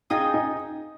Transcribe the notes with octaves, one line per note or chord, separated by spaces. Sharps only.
D#4 F4 G#4 D#5 G5
D#4